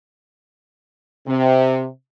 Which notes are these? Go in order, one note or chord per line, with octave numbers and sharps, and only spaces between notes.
C3